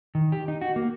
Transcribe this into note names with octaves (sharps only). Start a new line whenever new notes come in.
D#3
G4
D#4
F#4
A#3